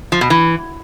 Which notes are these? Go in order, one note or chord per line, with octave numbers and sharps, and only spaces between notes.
F3
B2
E3